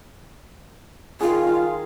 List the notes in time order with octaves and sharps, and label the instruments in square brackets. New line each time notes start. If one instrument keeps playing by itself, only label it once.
[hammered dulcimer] D#3 G#4 [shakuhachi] F4
[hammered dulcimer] D#5 F5